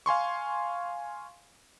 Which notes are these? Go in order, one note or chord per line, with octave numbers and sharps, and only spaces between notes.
F5 G#5 C6 C#6